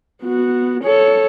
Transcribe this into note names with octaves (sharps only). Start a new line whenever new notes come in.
B3 F#4
A4 C#5